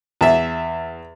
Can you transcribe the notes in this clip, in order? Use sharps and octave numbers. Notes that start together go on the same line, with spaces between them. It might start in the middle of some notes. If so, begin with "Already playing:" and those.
E2 E5